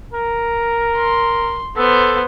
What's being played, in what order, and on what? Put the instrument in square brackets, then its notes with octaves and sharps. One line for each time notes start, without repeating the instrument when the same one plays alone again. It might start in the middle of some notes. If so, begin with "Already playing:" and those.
[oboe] A#4
[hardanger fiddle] C6
[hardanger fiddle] B3 C5 [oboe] A4